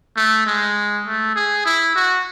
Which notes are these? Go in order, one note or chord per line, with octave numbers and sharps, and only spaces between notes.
A3
G#3
A3
G#4
E4
F#4